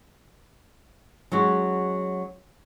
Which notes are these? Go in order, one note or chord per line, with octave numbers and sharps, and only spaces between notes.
F#3 G#3 C#4 F#4